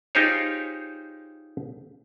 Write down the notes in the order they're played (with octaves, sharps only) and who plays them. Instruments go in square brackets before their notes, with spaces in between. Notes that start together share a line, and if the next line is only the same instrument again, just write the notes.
[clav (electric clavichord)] D#4 F4 G4 G#4 C5 C#5